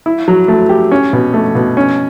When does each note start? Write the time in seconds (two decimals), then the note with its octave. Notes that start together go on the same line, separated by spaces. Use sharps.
0.06 E4
0.28 F#3
0.48 A3
0.69 G4
0.91 C#4
1.13 B2
1.34 A3
1.55 B2
1.77 C#4